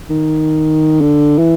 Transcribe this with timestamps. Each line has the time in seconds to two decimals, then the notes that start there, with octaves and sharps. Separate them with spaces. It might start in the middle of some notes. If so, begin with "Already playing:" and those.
0.10 D#3
1.01 D3
1.38 E3